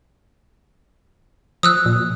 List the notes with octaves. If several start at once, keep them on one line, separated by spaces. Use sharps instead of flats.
F3 D#6 E6 F#6
A#2